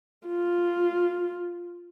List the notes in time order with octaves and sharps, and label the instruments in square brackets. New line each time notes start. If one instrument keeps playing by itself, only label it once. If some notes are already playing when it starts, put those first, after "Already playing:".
[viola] F4